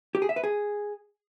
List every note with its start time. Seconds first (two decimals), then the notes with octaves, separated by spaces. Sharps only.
0.15 G4
0.22 G#4
0.29 E5
0.36 B4
0.44 G#4